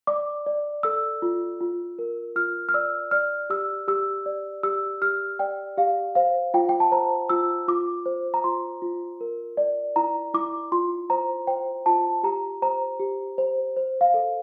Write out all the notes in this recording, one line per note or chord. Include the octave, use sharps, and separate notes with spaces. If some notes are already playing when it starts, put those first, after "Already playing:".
D5 D6
D5
A4 E6
F4
F4
A#4
F4 F6
F6
D5 E6
D5 F6
G4 E6
G4 E6
D5
G4 E6
G4 F6
D5 G5
G4 F5
C5 F5
F4 G5
G5
A5
C5 A#5
F4 E6
F4 D6
C5
A#5
F4 C6
F4
A#4
D5
E4 A#5
E4 D6
F4 C6
C5 A#5
C5 G5
F4 A5
G4 A#5
C5 A#5
G4
C5
C5
F5
A4